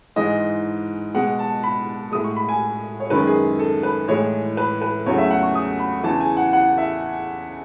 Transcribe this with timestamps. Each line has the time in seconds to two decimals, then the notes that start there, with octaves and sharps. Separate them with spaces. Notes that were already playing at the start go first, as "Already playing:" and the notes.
0.16 G#2 E3 G#3 D#5
1.14 B2 G#3 F#5
1.39 A5
1.64 B5
2.12 A2 G#3 D#6
2.24 C#6
2.36 B5
2.49 G#5
3.00 C#5
3.10 F#2 D#3 G#3 B4
3.27 G#4
3.59 A4
3.83 B4
4.08 A2 E3 G#3 C#5
4.57 B4
4.82 B4
5.06 E2 C#3 F#3 A3 C#5
5.18 E5
5.31 F#5
5.43 C#6
5.55 D#6
5.80 B5
6.03 E2 C#3 E3 A5
6.21 G#5
6.37 F#5
6.53 F#5
6.78 E5